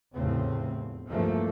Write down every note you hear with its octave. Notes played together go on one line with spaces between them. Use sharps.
F1 E2 A2 C#3 C4
C2 G2 E3 F3 A3 A#3